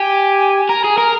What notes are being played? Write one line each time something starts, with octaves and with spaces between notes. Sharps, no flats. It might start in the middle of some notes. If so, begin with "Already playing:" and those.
Already playing: G4 G#5
A#4 A#5
G#4 G#5
A#4 A#5